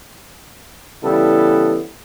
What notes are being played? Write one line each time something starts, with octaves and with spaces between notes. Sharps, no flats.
C#3 E3 G3 B3 E4 A4